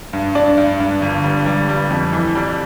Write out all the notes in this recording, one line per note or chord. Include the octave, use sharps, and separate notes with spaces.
G2
D4
G2
G2
G1
G3
G3
G3
F2
E3
G3